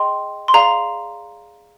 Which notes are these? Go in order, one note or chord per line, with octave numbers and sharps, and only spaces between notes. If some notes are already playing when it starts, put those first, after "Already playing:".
Already playing: G#4 D#5 G5 C6
C6
G#4 D5 F5 A#5